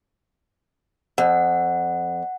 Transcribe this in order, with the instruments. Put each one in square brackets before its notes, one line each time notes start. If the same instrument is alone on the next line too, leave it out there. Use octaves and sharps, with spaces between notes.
[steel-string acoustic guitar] F2 [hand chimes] F#5